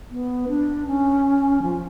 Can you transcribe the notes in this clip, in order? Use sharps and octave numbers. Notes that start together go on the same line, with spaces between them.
B3
D4
C#4
F3